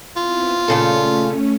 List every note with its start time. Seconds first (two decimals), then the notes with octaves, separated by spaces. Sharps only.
0.16 B3 C4 E4 F4
0.68 A#2 C#3 A3 C#4 A4